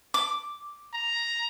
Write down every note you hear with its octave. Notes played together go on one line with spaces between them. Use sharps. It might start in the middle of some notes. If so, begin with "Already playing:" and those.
D6
A#5